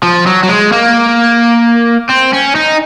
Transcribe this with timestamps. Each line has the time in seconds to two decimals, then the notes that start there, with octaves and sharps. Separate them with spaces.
0.03 F3
0.26 F#3
0.44 F#3
0.49 G#3
0.72 A#3
2.10 C4
2.33 C#4
2.55 D#4